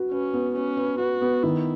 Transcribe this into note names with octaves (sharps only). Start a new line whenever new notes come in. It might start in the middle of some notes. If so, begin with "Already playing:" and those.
Already playing: F#4 B4
C#4 B4
B3
C#4 B4
B4
F#4 B4
B3
D#3 E4